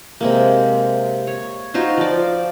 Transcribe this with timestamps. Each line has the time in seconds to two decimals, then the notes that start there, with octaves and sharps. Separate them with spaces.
0.21 C3 G#3 A#3
1.27 C#5
1.74 D#4 F4 F#4 C5
1.97 F3 D5